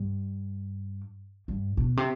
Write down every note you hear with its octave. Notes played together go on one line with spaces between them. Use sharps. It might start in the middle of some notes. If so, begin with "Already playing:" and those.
Already playing: G2
G2
B2
C3